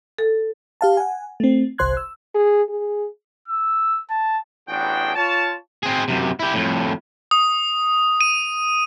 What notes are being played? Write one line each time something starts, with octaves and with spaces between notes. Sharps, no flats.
A4
G4 F5 A5
F#5 G#5
A3 C4
G1 C2 C5 C6 F#6 G#6
E6
G#4
G#4
E6
A5
A1 E2 D4 F#4 G#4 G5
F4 C#5 A5
C4 G#4
F#2 C3
E4 G4
F2 A2
D#6
D#7